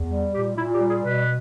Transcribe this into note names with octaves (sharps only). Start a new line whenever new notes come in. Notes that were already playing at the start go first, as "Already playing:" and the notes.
Already playing: E2
G3
A#2 G4
A#2 E4
G4
G3
G#4
B2 B4